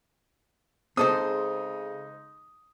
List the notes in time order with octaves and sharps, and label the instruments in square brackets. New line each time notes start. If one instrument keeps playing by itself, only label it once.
[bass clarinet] C#3 [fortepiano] G#3 D#4 [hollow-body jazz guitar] C4 A4 C5 [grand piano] D#6